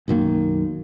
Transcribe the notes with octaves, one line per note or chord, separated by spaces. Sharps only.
B1 F#2 D#3 A#3